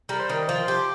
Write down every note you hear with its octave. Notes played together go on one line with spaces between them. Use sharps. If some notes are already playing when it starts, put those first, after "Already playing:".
G3 A#4
C5
D#3 A#4
F3 C5
G4